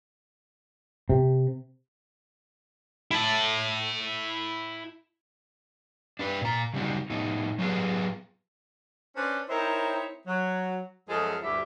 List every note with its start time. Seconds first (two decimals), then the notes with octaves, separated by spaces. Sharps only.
1.09 C3
3.11 E4 A5
6.19 D4 E4 B4
6.41 A#2 A#5
6.74 C#3 F#3 G3 C4 D#4 F#4
7.10 A2 B3 D#4
7.59 F#3 B3 F4 G4 G#4 B4
9.16 C#4 D4 B4 C5
9.49 C4 D#4 E4 A#4 C5 C#5
10.27 F#3
11.09 F#2 F3 G#3 A3 G#4 A4
11.43 D2 G2 E4 G4 E5